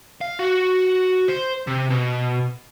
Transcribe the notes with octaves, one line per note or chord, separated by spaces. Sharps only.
F5
F#4
C5
C3
B2